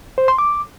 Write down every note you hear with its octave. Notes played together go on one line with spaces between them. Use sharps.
C5
C6
D6